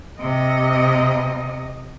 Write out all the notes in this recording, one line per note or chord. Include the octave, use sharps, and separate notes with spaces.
C3 D#5